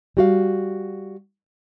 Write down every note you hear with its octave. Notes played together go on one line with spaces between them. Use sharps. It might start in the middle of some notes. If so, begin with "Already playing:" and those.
G3 F#4 F5